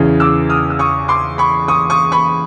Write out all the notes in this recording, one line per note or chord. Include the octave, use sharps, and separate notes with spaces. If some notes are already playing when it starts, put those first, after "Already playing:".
Already playing: E2 C#3 E3
D6 E6
D#6 F6
E6
C#6 D#6
C6 D6
B5 C#6
C#6 D#6
C#6 D#6
B5 C#6